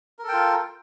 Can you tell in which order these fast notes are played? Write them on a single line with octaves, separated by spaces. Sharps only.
A#4 A4 G5 F4